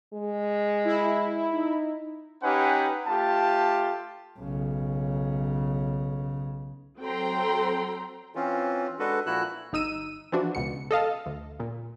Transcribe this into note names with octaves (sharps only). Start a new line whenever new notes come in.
G#3
E4
D#4
C#4 D#4 G4 B4 F#5 G#5
A3 F4 G4 A5
B1 C#3
F#3 C4 A4 G5 A#5 C6
E3 C4 C#4 F4
G#3 D4 F#4 A4 B4
A#2 F3 E4 F#4 E6 F#6
G1 D#4 E6 D#7
E3 F3 D4 F#4
C#2 B2 C#7
A4 D#5 F5 A5
D2
A#2